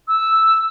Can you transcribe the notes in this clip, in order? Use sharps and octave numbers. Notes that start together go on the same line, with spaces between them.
E6